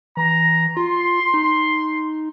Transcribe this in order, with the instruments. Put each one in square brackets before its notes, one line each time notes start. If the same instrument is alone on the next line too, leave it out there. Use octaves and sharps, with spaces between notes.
[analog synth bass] E3 [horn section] A#5
[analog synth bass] F4 [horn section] C6
[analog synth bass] D#4